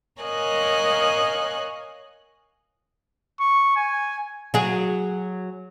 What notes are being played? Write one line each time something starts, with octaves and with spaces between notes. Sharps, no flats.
A#4 C#5 D#5 F5 G#5 F#6
C#6
G#5
F#3 G#4